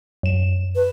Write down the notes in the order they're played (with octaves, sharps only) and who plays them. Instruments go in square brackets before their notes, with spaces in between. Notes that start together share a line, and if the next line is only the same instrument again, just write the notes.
[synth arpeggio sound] F#2 E7
[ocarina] B4